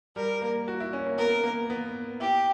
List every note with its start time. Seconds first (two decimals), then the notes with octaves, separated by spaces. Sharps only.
0.16 G3 A#4
0.42 A#3
0.68 F#4
0.80 E4
0.93 C#4
1.06 A#3
1.18 B3 A#4
1.44 A#3
1.70 B3
2.20 E4 G4